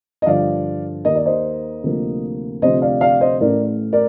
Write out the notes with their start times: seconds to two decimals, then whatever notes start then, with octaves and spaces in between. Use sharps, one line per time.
0.22 D#5
0.26 G2 D3 F3 D5 F5
1.05 D#2 D#3 A#3 D#5
1.15 D5
1.26 C5 D#5
1.83 D2 C3 F3 A#3
2.62 D2 C3 F3 C5 D#5
2.82 D5 F5
3.01 D5 F5
3.21 C5 D#5
3.41 A1 A2 A3 A#4 D5
3.93 A#4 D5